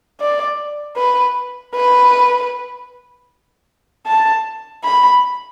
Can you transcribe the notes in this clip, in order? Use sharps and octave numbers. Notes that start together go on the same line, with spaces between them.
D5
B4
B4
A5
B5